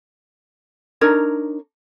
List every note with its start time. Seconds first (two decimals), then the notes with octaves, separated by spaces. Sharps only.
1.01 D4 D#4 A#4 C#5